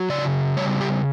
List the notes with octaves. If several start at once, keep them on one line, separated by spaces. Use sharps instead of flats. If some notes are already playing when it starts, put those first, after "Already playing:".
Already playing: F#3
C#3 D5
G3 C#5
G4